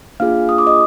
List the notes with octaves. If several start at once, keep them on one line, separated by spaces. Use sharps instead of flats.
A#3 D4 F4 G#4 F5 F6
D#6
D6
D#5 D#6